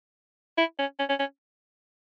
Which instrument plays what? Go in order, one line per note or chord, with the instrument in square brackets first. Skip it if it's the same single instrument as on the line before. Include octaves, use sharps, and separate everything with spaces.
[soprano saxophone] E4
C#4
C#4
C#4
C#4